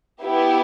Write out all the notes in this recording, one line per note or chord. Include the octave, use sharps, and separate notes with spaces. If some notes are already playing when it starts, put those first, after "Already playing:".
B3 E4 G4